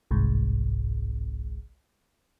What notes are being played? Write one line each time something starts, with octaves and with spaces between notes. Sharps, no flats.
G1 C2 G#2